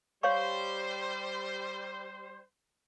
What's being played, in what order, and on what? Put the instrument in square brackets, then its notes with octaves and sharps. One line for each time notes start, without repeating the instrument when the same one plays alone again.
[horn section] G3 C5 [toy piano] C#5 F5 C#6